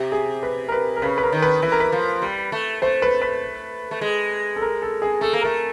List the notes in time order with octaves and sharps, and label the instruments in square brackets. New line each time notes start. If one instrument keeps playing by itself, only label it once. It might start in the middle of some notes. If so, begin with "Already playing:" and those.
Already playing: [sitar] C3 [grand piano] G4
[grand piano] G#4
B4
A#4
B4
A#4
[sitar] C#3 [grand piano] B4
[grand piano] B4
A#4
[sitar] D#3
[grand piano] B4
[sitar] E3 [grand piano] B4
[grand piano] A#4
B4
[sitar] F3
G3
A3
[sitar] A3 [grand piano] C5
[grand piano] B4
B4
[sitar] A3
G#3
[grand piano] A4
A#4
A4
G#4
[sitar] A3 [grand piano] A4
[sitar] A#3
[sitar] A3 [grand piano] A#4